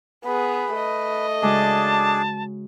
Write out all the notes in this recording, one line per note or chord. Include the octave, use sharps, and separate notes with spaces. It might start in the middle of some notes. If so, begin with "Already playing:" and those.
B3 G#4 B4
A3 D#5
C#3 G#3 D4 F#4 G#4 D5 A5